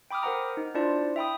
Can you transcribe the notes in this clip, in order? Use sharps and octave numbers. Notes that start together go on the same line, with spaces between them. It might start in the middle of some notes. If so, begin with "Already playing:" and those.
G5 B5 D6 D#6 F6
A#4 C5 F#5 A#5
D#4
D4 E4 F4 C5 D5 A5
E5 G5 B5 D#6